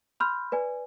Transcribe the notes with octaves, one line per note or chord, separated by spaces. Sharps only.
B5 C6 F6 G6
B4 D5 G#5